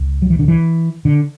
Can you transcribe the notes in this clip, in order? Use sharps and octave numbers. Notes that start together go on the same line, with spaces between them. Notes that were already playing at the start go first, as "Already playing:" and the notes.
Already playing: C#2
F#3
E3
D3
E3
D3